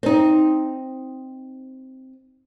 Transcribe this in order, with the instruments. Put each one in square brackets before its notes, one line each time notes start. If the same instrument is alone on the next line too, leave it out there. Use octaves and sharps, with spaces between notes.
[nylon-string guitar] C4 D#4